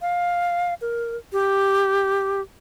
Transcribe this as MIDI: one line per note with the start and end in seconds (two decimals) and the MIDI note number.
0.01 0.74 77
0.81 1.17 70
1.33 2.41 67